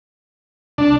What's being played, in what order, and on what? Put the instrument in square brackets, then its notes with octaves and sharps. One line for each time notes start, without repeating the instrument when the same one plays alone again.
[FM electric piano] C2 [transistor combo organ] D4